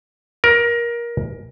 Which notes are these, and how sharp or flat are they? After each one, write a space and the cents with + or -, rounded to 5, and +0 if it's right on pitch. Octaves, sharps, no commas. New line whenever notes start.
A#4 +20